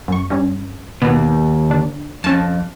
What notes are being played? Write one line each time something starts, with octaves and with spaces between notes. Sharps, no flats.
F#2 C#6
G2 C#4
D#2 B2 B3
D3 D4
F2 C#4 A5